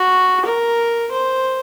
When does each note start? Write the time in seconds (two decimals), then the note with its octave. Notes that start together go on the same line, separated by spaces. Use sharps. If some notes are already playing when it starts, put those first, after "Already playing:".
Already playing: F#4
0.45 A#4
1.12 C5